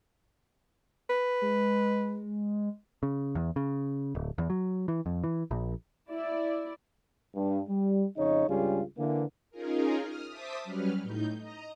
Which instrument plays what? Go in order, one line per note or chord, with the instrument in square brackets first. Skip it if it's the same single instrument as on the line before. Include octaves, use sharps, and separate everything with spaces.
[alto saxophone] B4
[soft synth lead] G#3
[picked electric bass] C#3
E2
C#3
D1
E2
F#3
E3
F2
E3
A#1
[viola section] E4 D5
[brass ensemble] G2
G3
F2 C#3 D#4 C#5 D#5
C#2 G2 G3 C#4 F4 G#4
D3 E3 A#3
[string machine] C#4 D#4 F4 G#4 A#4
D#6 F6
C5 E5 A5 D6 D#6 B6
F#3 G3 C#4 B4 F6
A2 D#4 G6
D#5 A#5